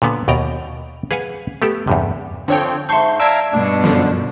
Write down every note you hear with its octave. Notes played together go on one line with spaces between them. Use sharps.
A#2 D3 B3
D#2 B2 D5 G5 A#5
G#4 B4 F5 F#5 G#5
A3 B3 G4 A4
E2 G2 C3
D3 F3 C4 C#5 G5
G#2 E5 A5 C6 C#6 G6
D5 E5 F5 A5 A#5 E6 G#6 D7
G2 B2 D4
F#2 D3 F3